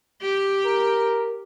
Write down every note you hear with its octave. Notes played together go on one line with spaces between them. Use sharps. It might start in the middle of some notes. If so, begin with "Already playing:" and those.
G4
A#4